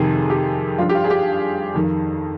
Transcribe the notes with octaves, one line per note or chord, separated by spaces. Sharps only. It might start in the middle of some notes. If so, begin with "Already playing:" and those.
Already playing: F2 C3 D#3 G#4
G4
G2 F3 F4
G4
F4
G#4
G4
F2 D#3